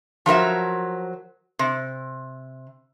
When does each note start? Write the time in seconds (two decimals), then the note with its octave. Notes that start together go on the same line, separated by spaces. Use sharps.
0.26 F3 F#3 A#4 E5
1.59 C3